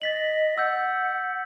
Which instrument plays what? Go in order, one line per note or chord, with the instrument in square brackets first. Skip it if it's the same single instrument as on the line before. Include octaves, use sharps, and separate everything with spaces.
[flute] D#5 [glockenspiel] A6 B6 F#7
[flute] F#5 [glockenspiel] E6 G6